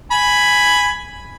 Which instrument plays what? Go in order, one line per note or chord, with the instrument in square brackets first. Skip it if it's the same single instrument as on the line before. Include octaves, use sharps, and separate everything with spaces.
[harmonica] G#5 B5